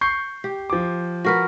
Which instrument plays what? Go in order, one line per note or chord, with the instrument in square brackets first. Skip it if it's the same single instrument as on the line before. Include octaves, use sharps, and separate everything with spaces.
[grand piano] C#6 G6 C7
[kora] G4
[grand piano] F3 D6
[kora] F#4 A#4 B4